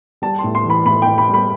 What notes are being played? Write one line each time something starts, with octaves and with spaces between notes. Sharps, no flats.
G3 A5
C6
A2
C6
E3 B5
A2 B5
A2 G5
B5
G3
B5